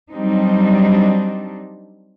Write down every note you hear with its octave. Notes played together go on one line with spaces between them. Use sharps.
F#3 G3 C4 D4 D#4